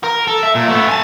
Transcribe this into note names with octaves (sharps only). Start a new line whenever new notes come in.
A#4
A4
E5
A#2
A3 B3
G#5 A5